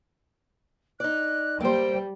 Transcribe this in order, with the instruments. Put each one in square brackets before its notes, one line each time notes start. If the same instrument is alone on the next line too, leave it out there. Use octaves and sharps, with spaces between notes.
[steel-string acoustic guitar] D#4 D5 [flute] F#6
[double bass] G3 [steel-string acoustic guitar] A#3 C5 [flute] G5